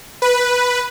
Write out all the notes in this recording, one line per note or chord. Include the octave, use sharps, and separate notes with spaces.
B4